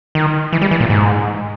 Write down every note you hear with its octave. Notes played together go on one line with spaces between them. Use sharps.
D#3
E3
G3
E3
A#2
G#2